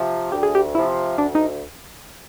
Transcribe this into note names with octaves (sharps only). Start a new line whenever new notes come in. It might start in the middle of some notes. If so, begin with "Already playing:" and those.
Already playing: C3 F3
D2 G4
G#4
G4
C3 F3 E4
D2 D4
D#4